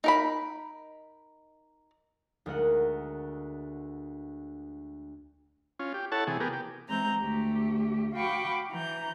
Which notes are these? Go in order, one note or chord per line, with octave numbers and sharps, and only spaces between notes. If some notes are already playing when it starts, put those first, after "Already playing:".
D#4 A#4 B5
D2 G#3 A#4 D#5 F#5
C#4 F4
G4
E4 A4 C#5 F#5 A5
C3 E3 G#4
B3 G4 G#4 A#4
G4
E3 G#3 C4 A#5 G6
D2 A3 G4
F#4 F5 G5 B5 C#6 D6
E3 A#5 G6